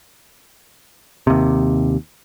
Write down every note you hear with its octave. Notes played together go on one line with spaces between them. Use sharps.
D#2 C3